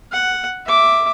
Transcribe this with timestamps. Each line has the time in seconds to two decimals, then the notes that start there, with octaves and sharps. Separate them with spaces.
0.12 F#5
0.66 E5 D6